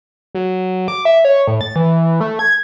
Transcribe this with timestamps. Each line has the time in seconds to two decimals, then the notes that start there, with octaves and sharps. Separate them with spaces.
0.35 F#3
0.88 D6
1.05 E5
1.25 C#5
1.48 A2
1.61 A6
1.76 E3
2.21 A3
2.39 G#6